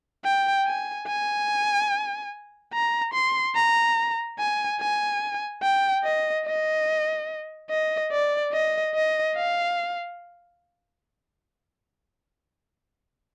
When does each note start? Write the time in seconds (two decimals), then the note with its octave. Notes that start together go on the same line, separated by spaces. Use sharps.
0.24 G5
0.66 G#5
1.08 G#5
2.73 A#5
3.14 C6
3.55 A#5
4.39 G#5
4.80 G#5
5.63 G5
6.04 D#5
6.46 D#5
7.71 D#5
8.12 D5
8.53 D#5
8.95 D#5
9.36 F5